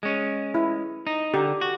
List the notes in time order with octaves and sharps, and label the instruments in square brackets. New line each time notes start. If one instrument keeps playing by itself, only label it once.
[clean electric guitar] G#3 C#4
[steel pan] E4
[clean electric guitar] D#4
[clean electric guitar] D3 [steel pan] G4
[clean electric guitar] F#4